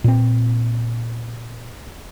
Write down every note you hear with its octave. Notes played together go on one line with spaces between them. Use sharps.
A#2 C4